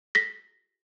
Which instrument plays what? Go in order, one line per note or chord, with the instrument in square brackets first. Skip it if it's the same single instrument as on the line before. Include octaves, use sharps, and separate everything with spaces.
[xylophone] A#6 B6